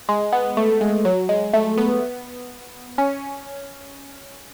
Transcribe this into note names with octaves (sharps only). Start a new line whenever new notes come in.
G#3
B3
A3
G#3
F#3
G#3
A3
B3
C#4